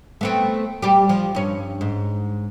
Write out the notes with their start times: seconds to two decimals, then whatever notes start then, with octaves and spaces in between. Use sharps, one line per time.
0.21 A3 B3 C4
0.82 G3 G4
1.09 F3
1.35 G2 C#4
1.81 G#2